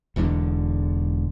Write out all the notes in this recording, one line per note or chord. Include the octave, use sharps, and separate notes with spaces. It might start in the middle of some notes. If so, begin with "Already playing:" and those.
E1 E2 G#2 D3